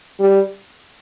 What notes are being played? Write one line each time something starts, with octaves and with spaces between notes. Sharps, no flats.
G3